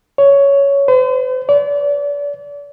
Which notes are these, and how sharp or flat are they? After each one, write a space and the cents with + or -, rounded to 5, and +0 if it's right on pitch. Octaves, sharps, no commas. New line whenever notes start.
C#5 +10
C5 -45
D5 -35